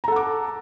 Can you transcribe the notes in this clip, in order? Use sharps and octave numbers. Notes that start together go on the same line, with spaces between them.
A4 F#5 A#5 D6